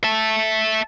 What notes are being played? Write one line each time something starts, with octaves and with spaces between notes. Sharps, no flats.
E5 A5